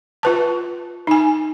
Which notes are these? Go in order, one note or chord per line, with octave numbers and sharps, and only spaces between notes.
F4 B4 A5
D#4 G#5